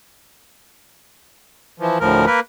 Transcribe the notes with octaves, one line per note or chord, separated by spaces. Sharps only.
E3 F3
D2 A2 F3 A#4
A#3 A#4 B4